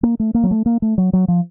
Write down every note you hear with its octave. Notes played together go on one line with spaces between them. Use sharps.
A#3
A3
A#3
F#3
A3
A#3
A3
F#3
F#3
F3